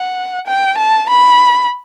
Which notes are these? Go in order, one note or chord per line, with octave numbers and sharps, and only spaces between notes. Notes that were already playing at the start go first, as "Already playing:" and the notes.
Already playing: F#5
G5
A5
B5